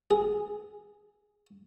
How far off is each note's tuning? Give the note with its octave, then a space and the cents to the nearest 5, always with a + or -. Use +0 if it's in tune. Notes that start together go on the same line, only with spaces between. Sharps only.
G#4 -5